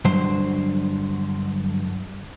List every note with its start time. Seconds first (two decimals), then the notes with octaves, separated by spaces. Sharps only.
0.05 G2 D3 F#3 C5